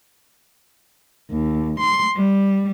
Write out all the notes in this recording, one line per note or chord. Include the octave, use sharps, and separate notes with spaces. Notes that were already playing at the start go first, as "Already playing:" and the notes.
D#2
C6
G3